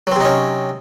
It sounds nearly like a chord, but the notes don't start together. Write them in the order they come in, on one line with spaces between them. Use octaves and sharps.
F#3 C4 C3 D#4 C#4